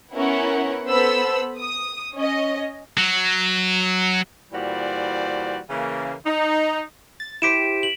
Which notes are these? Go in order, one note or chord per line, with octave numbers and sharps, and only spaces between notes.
B3 C#4 E4 A#4 F#5
B3 A4 C5 B5 E6
D#6
C#4 D#5
F#3
A#2 E3 G3 F#4 C5 D5
C#3 E3 A#3
D#4
A6
E4 G4 C5 B6 D7 E7
F#7